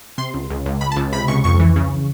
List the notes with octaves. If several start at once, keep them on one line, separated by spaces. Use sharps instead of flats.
C3 C6
C#2
C#2
C#2
C#2 B5
A5
C#2
C3 B5
C#2 C#6
F2 C#6
E3
C#3